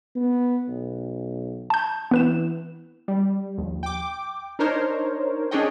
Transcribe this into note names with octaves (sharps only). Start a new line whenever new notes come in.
B3
B1
A5 G6
E3 B3 B4 E7
G3
A#1 D#2
G5 D6
D4 D#4 A#4 C5 C#5
C#4 D4 G#4 C#5 D#5 G5